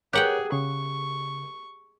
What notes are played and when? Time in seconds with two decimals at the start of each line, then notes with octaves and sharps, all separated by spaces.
0.13 G4 G#4 A#4 C#5 F#5 G5 F#6
0.52 C#3 C#6